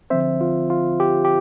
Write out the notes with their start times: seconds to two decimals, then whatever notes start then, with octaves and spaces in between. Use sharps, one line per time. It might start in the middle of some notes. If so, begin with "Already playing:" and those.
0.10 D3 F3 C4 C5 E5
0.41 F4
0.70 F4
1.00 G4
1.25 G4